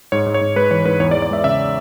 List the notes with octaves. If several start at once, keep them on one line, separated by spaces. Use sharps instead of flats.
G#2 C#5
G#2
C#5
G#2
G#3 B4
E3 C#5
G#2 B4
E2 C#5
D5
E2
D5
G#3 E5
C#3 E5